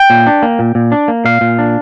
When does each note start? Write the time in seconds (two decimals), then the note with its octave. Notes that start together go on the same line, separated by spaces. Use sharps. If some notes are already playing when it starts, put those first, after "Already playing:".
Already playing: G5
0.10 A#2
0.27 D4
0.43 A#3
0.59 A#2
0.75 A#2
0.92 D4
1.08 A#3
1.25 A#2 F5
1.41 A#2
1.59 D4